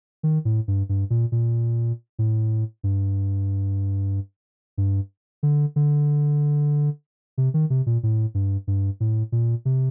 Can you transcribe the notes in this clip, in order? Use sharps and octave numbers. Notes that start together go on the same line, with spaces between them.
D#3
A2
G2
G2
A#2
A#2
A2
G2
G2
D3
D3
C3
D#3
C3
A#2
A2
G2
G2
A2
A#2
C3